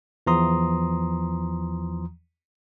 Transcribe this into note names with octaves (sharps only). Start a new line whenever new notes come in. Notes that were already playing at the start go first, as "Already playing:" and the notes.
E2 E3 F3 A#5 C6 D#6